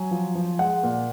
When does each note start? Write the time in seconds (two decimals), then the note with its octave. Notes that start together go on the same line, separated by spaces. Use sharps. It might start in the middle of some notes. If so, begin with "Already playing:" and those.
Already playing: F#3 G#5
0.11 F3
0.35 F3
0.59 G#3 F#5
0.83 A#2